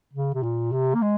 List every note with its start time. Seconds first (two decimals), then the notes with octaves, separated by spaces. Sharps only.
0.13 C#3
0.34 C3
0.43 A#2
0.72 C3
0.95 A#3
1.02 G#3